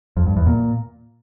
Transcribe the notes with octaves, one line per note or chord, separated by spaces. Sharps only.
F2
G2
E2
A#2